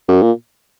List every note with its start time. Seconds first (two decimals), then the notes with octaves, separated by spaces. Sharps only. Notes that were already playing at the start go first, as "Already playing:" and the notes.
0.08 F#2
0.22 A#2